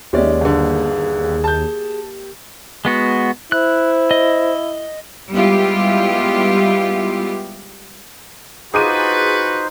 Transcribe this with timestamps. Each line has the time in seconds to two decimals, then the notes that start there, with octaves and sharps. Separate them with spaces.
0.13 D#2 G#3 A#3 C#4 G4 D5 E5
0.41 G1 D3 G#4
1.44 A5 G6
2.85 G#3 B3 F#4
3.52 E4 C5 F#6
4.11 D#5
5.32 G3 G#3 B3 E4 F4 G4
8.74 D#4 F4 F#4 G#4 B4 C5 D6 D#7